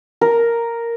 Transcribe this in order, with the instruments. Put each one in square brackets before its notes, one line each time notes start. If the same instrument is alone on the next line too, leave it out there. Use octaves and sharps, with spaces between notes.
[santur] A#4